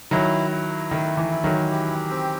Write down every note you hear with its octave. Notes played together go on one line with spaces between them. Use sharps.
D#3 F#3 E4
E4
D#3 A3
E3
E4
D#3 F#3
G4
C4